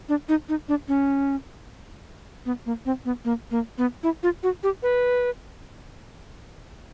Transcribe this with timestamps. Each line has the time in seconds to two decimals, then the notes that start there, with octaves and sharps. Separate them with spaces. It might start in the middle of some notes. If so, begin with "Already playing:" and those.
0.09 D4
0.29 D#4
0.49 D#4
0.69 D4
0.88 C#4
2.46 B3
2.66 A#3
2.86 C4
3.05 B3
3.25 A#3
3.51 A#3
3.78 B3
4.03 E4
4.23 F4
4.43 F#4
4.63 G4
4.83 B4